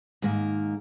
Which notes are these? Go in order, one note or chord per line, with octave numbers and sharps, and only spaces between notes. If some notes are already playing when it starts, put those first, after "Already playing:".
G#2 D#3 A#3